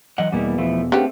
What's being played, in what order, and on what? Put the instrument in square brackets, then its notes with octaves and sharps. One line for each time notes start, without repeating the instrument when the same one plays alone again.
[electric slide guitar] E3 D#5 F#5 [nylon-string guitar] F#3
[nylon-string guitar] E2 B2 F#5 [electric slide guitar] G3 A#3 E4
[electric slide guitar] F3 A3 E4
[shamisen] C#3 B3 G4 [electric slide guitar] A3 C4 [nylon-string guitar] D4 A4